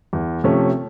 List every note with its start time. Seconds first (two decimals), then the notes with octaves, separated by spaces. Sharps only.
0.13 E2
0.44 C3 F3 A3 C#4